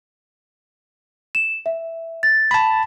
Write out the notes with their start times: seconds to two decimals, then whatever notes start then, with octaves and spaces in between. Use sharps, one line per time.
1.35 E7
1.66 E5
2.23 A6
2.51 A5 B5